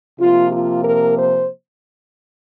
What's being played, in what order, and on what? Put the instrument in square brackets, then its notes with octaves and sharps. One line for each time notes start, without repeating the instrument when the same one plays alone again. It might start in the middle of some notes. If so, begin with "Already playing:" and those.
[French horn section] C3 F3 A#3 F4
F4
A#4
C5